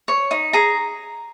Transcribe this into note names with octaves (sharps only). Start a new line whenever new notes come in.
C#5
D#4
G#4 A#5